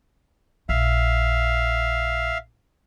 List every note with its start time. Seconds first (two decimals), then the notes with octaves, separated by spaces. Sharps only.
0.69 A#1 E5 F5